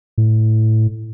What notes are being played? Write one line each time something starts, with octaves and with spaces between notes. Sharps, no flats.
A2